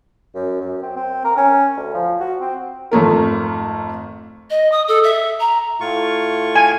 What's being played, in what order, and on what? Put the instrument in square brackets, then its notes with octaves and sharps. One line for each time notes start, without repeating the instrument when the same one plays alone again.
[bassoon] F#2
F#2
C4
C4
A#4
C#4
D2
F3
F#4
C4
[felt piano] G#1 F2 A3 A#4
[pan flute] D#5
D#6
A4
E5
A#5
[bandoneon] A2 F4 C#6
[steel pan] G#5